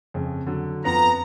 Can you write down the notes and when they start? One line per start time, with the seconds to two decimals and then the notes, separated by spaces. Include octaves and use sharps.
0.14 F2 C#3
0.47 D3 F#3
0.85 F2 B3 F4 A#5